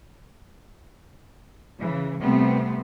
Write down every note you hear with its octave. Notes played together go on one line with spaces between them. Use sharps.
C#3 E3
C3 G3 A3 B3 C4